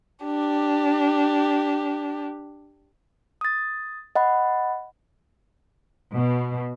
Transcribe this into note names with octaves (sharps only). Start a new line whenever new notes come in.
D4 G4
D#6 A6
D#5 F#5 B5
B2